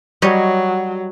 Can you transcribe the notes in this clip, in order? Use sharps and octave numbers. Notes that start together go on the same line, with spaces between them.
F#3 G3 C#5 D#5